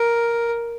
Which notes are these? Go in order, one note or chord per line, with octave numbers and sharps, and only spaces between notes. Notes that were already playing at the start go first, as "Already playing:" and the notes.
Already playing: A#4